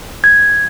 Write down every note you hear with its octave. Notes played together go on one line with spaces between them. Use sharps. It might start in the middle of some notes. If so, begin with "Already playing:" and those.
G#6